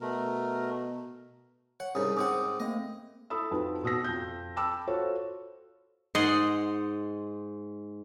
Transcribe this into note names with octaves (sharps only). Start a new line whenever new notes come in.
B2 A3 A#4
C#5 F#5
C2 G#2 C#3 D#6
G#2 C4 F#5 D6 D#6
A3 A#3 C4 D#5
E4 A4 B5 D#6 E6
F2 F#3 D#4 B4
B2 D#6 E6 A#6
F2 G6
G5 A5 B5 D6 E6
F4 F#4 A4 C5 C#5
G#2 D#5 F#5 C6